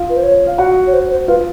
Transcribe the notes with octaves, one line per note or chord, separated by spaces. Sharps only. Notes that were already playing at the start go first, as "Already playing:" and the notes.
Already playing: F4 F5
B4
C5
C#5
F5
F#4 F#5
C#5
C5
C5
F4 B4 F5